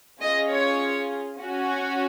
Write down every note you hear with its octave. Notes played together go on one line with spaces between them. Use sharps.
C#4 F4 G#4 D#5
C#5
C#4 F#4